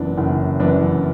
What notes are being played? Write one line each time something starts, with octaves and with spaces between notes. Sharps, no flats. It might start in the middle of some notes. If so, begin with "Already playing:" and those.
Already playing: F#1 F#2 E3 B3 D4
F#1
F#2 E3 B3 D4